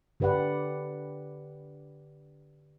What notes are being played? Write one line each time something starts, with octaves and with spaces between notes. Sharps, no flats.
D3 G4 B4 D5 F#5